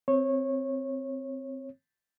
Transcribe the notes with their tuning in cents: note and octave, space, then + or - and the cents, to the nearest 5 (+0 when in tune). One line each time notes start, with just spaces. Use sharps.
C4 +0 C#5 -20